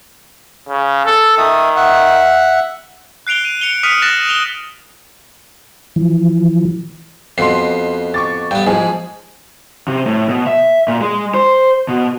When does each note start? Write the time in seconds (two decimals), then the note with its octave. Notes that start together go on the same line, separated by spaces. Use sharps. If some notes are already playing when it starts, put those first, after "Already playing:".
0.69 C#3
1.06 A4
1.38 D#3 E5 D#6
1.76 E5 F#5
3.27 F#6 C7 D7 F7 G7
3.45 D#7
3.61 C#7 F7 G7
3.83 D#6 F6 B6 C#7 D#7 F7
4.02 F#6 A6 A#6 E7
4.27 D#7 F7 G7
5.96 E3 F3
7.38 F2 B2 C6 C7
8.14 C#6 D6 A6
8.51 G2 B3 G5
8.67 G#2 F3 G#3 G#4
9.88 C3
10.06 A2
10.29 B2
10.47 E5
10.88 A#2
11.01 G#3
11.34 C5
11.88 B2